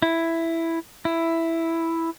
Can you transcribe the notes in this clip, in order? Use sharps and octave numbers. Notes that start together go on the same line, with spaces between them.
E4
E4